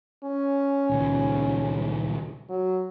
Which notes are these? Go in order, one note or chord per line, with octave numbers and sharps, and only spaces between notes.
C#4
D#1 C#2
F#3